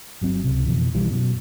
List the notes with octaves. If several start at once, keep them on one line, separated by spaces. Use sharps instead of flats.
G1 F#3 C4
C#2 C3
F2 B2 E3
B1 D#3 E3 G3
F#2 B2 F#3